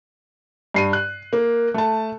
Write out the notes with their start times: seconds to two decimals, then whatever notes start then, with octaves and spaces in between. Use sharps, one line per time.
0.74 G2 C7 D#7
0.93 F#6
1.33 A#3
1.74 A3 A5